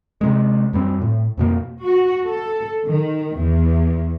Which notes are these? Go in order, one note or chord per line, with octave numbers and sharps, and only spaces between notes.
C3 G#3
F#2 G3 G#3 C4
A2
F2 B2 A#3
F#4
A4
D#3
E2